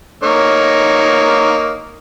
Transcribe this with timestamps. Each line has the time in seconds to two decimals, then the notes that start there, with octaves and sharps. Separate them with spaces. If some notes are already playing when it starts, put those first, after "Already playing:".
0.23 A#3 D#4 C#5